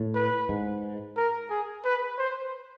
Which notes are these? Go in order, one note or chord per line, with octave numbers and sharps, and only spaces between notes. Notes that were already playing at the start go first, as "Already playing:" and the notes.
Already playing: A2
B4
G#2
A#4
G#4
B4
C5